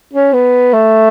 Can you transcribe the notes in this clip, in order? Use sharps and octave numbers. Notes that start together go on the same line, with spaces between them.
C#4
B3
A3